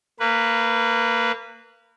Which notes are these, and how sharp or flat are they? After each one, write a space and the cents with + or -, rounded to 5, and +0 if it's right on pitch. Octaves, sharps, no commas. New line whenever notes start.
A#3 -25 B4 -5